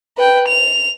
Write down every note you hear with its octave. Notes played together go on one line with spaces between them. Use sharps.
B4 G5
F7